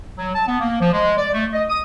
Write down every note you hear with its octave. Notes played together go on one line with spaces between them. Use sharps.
F#3
A5
B3
A#3
F3
G#3
D5
A3
D#5
D#6